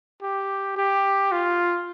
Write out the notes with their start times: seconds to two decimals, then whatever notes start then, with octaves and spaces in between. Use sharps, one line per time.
0.22 G4
0.77 G4
1.32 F4